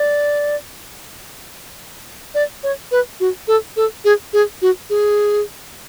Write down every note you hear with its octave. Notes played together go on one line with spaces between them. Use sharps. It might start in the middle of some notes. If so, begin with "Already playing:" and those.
Already playing: D5
D5
C#5
B4
F#4
A4
A4
G#4
G#4
F#4
G#4